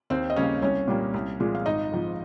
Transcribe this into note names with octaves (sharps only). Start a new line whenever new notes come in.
D#2 C4 C5
D#5
C#3 G3 A#3 C#4 C#5
C2 C#4 C#5
A#2 G3 A#3
C2
A#2 F3 G#3
F5
G#1 D#4 D#5
G#2 F3